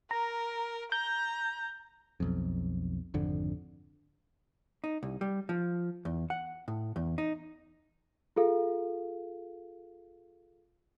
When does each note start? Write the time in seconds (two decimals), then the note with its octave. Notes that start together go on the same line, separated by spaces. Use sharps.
0.11 A#4 A#5
0.92 A#5 G6
2.20 B1 F2
3.14 G#1 F2 D3
4.84 D#4
5.03 C2
5.21 G3
5.49 F3
6.05 E2
6.30 F#5
6.68 A2
6.96 E2
7.18 D#4
8.36 F4 G#4 A4 F5